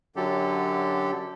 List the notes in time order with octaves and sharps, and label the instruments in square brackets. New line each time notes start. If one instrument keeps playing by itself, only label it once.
[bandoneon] F#2 D3 F#3 G4 A4